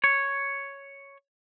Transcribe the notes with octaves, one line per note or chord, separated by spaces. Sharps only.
C#5